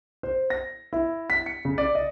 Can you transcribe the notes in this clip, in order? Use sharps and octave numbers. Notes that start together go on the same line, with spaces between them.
C5
A#6
E4
B6
C#7
C#3
D5
D#5